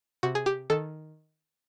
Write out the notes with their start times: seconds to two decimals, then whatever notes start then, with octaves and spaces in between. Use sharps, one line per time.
0.23 C3 F#4
0.35 G#4
0.46 G4
0.70 D#3 A4